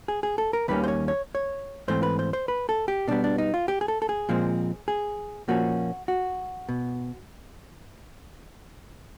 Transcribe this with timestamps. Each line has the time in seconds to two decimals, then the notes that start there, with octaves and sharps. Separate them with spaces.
0.08 G#4
0.23 G#4
0.38 A4
0.53 A#4
0.68 D#2 D#3 G3 A#3 C#4 B4
0.84 C5
0.88 C#5
1.08 C#5
1.35 C#5
1.88 G#2 E3 A3 C4 C5
2.03 B4
2.19 C5
2.33 C5
2.48 B4
2.69 A4
2.88 G4
3.08 B2 G3 B3 D4
3.24 D4
3.38 D#4
3.54 F4
3.68 G4
3.81 G#4
3.88 A4
4.02 A4
4.09 G#4
4.29 A#2 F3 G#3 C4
4.88 G#4
5.48 A#2 F3 A#3 C#4 F#4
6.08 F#4
6.69 B2